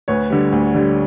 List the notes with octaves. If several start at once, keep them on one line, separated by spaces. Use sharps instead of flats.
D2 B4 C#5
D3 G3
D2
D3 G3